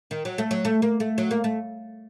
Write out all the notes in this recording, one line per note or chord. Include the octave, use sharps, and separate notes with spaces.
D#3
F#3
A3
F#3
A3
A#3
A3
F#3
A#3
A3